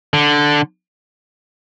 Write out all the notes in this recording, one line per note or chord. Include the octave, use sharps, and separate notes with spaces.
D3